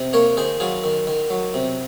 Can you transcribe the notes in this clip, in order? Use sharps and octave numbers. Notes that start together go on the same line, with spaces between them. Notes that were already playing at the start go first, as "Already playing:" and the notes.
Already playing: C3
A#3 A#4 C#5
D#3 G#4 C5
F#3 F4 G#4
D#3
D#3
F#3
C3